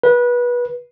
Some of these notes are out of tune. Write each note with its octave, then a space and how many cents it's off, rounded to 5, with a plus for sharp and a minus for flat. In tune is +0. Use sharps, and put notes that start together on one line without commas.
B4 -25